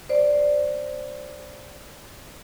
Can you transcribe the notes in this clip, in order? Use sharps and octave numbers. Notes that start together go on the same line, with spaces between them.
C5 D5